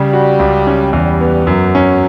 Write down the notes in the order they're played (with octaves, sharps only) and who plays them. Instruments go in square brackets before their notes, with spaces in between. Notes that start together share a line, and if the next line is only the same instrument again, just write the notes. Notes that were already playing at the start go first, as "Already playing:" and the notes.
Already playing: [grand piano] C#3 [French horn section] G3
[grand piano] F#4
C#2
C#4
[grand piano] E2 [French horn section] G3
[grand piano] B3
[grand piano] F#2 [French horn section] F#3
[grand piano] C#4